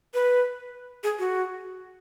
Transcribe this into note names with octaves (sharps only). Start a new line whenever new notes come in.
B4
G#4
F#4